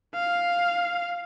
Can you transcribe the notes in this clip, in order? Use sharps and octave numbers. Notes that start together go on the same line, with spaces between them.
F5